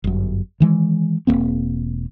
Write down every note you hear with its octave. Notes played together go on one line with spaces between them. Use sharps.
G1 F#2
D#3 E3 G#3
E1 G2 A#3 C4